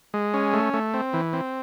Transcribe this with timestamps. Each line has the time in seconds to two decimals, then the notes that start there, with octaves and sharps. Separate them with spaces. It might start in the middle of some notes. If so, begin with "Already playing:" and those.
0.14 G#3
0.34 C#4
0.53 A3
0.74 A3
0.94 C4
1.13 E3
1.33 C4